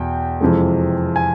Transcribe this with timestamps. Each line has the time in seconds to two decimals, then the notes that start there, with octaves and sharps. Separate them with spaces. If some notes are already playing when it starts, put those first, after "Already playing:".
Already playing: E2 B2 G5
0.41 F2 C3 E3 G#3
1.16 G#5